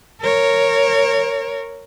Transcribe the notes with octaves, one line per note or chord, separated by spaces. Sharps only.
A#4 C#5